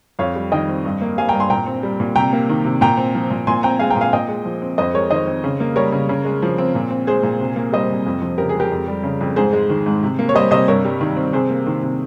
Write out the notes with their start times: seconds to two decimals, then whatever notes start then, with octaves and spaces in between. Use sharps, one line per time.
0.19 F2 C#5 F5
0.36 G3
0.52 D#3 D#5 G5
0.69 C4
0.85 G2
1.01 A#3
1.18 G3 F5 G#5
1.29 G5 A#5
1.34 G2
1.39 G#5 C6
1.50 A#2 G5 A#5
1.67 C4
1.83 G3
2.00 A#2
2.16 C3 G5 A#5
2.33 A#3
2.49 D#3
2.65 C3
2.81 A#2 G5 A#5
2.97 C4
3.15 F3
3.30 A#2
3.47 A#2 G#5 C6
3.63 C4 G5 A#5
3.79 G#3 F5 G#5
3.90 G5 A#5
3.96 A#2
4.01 F5 G#5
4.13 A#2 D#5 G5
4.28 G#3
4.45 F3
4.62 C4
4.78 F2 C5 D#5
4.94 G#3 A#4 C#5
5.11 D#3 C5 D#5
5.27 C4
5.44 C#3
5.60 A#3
5.76 G3 A#4 C#5
5.92 C#3
6.09 C#3
6.25 G#3
6.42 F3
6.58 C4
6.75 A#2
6.90 C4
7.07 G#3 G#4 C5
7.23 A#2
7.40 C3
7.56 A#3
7.72 G3 C5 D#5
7.90 C3
8.06 F2
8.22 F3
8.38 C#3 G4 A#4
8.49 G#4
8.55 G#3
8.60 G4 A#4
8.72 F2
8.88 G3
9.03 C#3
9.21 F2
9.36 G#2 G#4 C5
9.53 G#3
9.69 D#3
9.86 G#2
10.03 C3
10.19 A#3
10.29 C#5
10.34 G3 C5 D#5
10.51 C3 C5 D#5
10.68 G2 A#4 C#5
10.85 G3
11.01 D#3
11.16 C4
11.33 C3 G#4 C5
11.50 A#3
11.66 D#3
11.83 C3